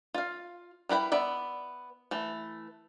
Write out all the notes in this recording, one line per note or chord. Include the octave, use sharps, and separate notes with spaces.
F4 F5
G3 E4 B4 G5
B3 D5 E5
E3 A3